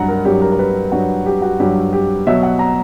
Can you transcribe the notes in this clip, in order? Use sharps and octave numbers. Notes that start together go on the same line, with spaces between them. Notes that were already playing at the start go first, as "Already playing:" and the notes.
Already playing: G2 F#3 F#5 A#5
A#4
G2 F#3 G4
A#4
A#4
B4
G2 F#3 F#4
G4
F#4
G2 F#3 G4
G4
B2 F#3 E5
F#5
A#5